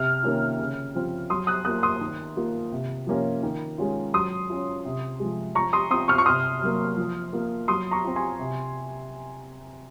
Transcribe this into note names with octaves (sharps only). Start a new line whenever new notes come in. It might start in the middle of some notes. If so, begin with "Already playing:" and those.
Already playing: C3 F6
D#3 A#3 C#4 F4
C#3
F3 C4 F4
F#3 C6 D#6
D#6 F#6
A#3 F4 D#6 F#6
C6 D#6
D#3
A#3 F4
C3
F3 A#3 C#4 F4
D#3
G#3 C#4 F4
F#3 C6 D#6
C#4 F4
C3
F3 G#3
F3 A#5 C#6
C6 D#6
C4 F4 C6 D#6
C#6 F6
C#6
C3 C6 D#6
F#3 A#3
F3
A#3 F4
F#3 C6 D#6
A#5 C#6
C4 F4
G#5 C6
C3